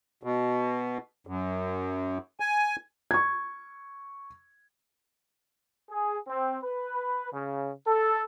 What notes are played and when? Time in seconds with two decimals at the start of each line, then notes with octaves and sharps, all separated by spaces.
0.23 B2
1.27 F#2
2.40 G#5
3.11 C#6 G#6
5.90 G#4
6.28 C4
6.63 B4
7.32 C#3
7.87 A4